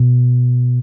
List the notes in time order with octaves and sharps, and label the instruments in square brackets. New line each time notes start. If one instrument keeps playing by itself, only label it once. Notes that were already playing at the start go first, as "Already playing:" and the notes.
Already playing: [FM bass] B2